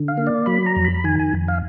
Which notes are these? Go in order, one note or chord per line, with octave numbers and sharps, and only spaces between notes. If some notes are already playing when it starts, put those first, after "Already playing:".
Already playing: D3
F5
A#3
D5
F#3 B5
A#5
F2
B5
D#3 G#5
G#5
F2
F5